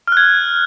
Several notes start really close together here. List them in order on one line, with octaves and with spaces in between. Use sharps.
F6 F#6 G#6